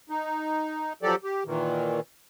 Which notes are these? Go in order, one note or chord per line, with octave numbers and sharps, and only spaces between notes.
D#4
F3 F#3 G4 A4 D5
G4
A#2 D#3 E3